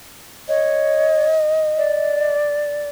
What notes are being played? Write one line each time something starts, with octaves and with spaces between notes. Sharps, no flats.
C#5 D#5
D5